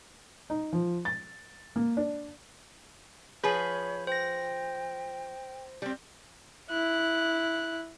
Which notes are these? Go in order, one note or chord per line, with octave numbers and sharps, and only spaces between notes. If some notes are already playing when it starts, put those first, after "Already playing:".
D#4
F3
A6
A#3
D4
F3 G#4 B4 C#5 B5 G6
C5 G5 A#6
G3 C4
E4 F#6